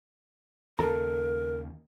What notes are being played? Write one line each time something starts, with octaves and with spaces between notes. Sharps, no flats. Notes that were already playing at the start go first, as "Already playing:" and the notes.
D#2 C#3 A4 A#4 A#5